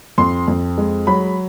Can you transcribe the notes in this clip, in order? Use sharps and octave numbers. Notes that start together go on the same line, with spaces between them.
F2 C6
F2
G#3
F#3 B5